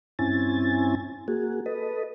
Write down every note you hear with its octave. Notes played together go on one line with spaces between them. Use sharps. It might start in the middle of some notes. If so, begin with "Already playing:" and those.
G2 C4 C#4 E4 G#5 A6
A#3 F#4 G#4
A4 B4 D#5